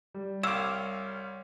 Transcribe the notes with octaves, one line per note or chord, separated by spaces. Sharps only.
G3
C2 C#5 F5 D6 E6 E7